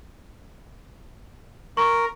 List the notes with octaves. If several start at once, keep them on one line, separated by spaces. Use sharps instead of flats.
A#4 C#6